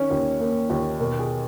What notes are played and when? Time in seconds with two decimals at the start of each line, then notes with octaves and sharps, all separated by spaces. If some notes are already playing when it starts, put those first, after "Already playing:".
Already playing: D#3 C#4 C#5
0.11 D#2
0.40 A#3
0.70 D#2
1.00 B2 A#4
1.19 G#4